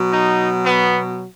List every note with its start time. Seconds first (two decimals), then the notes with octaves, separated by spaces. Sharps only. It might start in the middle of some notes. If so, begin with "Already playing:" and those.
Already playing: B2 F#3
0.12 D#4
0.63 B3